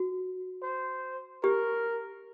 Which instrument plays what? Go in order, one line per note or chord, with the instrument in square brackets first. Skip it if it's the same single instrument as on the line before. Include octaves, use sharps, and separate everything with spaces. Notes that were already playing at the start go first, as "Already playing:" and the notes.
Already playing: [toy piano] F#4
[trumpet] C5
[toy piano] G4 [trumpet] A#4